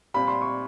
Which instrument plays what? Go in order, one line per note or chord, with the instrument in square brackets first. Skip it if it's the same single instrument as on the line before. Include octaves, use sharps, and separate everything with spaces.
[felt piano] A#2 G3 C4 [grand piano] B5
[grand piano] C6
C#6